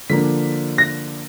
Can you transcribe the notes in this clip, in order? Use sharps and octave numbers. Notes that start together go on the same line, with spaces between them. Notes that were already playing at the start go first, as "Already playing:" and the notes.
D3 F3 A#3 D4 B6
A#6